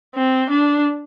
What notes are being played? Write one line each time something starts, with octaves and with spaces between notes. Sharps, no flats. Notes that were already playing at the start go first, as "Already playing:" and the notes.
C4
D4